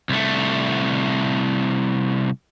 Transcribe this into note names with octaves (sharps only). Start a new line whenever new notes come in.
C2 A3